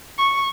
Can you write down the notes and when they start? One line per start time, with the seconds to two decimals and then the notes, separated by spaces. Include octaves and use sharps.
0.18 C#6